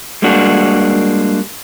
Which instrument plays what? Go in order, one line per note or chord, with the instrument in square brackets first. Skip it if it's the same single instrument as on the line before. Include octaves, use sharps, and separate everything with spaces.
[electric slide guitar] G3 G#3 A#3 D4 F#4